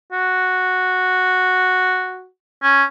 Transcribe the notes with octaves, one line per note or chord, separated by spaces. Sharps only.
F#4
C#4